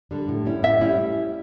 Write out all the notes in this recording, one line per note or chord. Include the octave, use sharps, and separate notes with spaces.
D3 G3 D4
A2
G3 C#4 E4
A2 E5
G3 C#4 E4